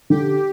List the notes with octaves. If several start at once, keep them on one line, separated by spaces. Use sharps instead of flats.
D3 G4